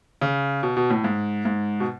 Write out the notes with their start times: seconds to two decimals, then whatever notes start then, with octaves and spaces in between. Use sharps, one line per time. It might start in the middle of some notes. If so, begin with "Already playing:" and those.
0.21 C#3
0.63 B2
0.77 B2
0.90 A2
1.04 G#2
1.45 G#2
1.80 B2